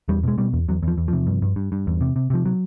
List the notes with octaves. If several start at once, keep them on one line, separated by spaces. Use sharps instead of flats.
E2 G3
B2 G#3
B2 G3
E2
E2 F#3
E2 F3
E2
C3 F3
G2
G2
G2
G2
E2
C3
C3
C3 F3
F#3